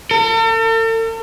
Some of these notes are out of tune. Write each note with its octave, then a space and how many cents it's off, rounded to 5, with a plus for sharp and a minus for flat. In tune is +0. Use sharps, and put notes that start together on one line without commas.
A4 +45